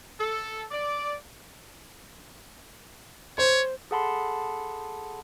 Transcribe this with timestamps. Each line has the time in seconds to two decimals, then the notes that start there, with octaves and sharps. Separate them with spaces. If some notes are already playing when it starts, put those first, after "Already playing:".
0.20 A4
0.71 D5
3.38 C5 C#5
3.91 G#4 A4 F#5 A5 B5 C6